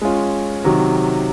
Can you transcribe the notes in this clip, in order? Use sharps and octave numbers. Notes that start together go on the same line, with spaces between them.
G#3 C#4 F4
C3 D#3 F#3